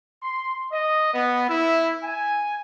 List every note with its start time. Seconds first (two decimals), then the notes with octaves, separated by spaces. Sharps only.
0.22 C6
0.71 D#5
1.13 B3
1.48 E4
2.03 G#5